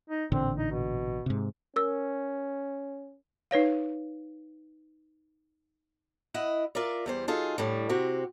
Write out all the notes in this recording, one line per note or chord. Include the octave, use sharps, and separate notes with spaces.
D#4
A1 A#2 D3 C4
D#4
B2
G#2 C3
C#4 A#4 E6
D#4 B4 C#5 F5
E4 D#5 F#5
F4 A#4 D5 E5
E2 G3 C5
F#3 D#4 F4 G#4 A4
A2 D3 G3
C3 C4 F#4 G4